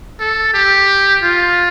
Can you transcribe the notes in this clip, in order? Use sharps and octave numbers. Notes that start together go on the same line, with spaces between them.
A4
G4
F4